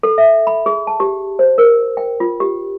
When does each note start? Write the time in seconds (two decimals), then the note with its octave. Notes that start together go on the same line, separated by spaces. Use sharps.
0.03 A4
0.18 E5
0.47 B5
0.66 G#4
0.87 A5
1.00 G4
1.39 C5
1.58 A#4
1.97 G5
2.20 F4
2.40 G4